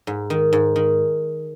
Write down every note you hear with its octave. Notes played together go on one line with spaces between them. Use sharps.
G#2
D#3
G#2
D#3